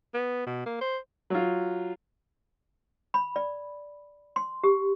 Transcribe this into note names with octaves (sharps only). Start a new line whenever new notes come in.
B3
B2
A#3
C5
F#3 F4
B5
D5
C6
G4